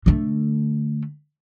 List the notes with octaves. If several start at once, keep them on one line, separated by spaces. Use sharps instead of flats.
D3 A3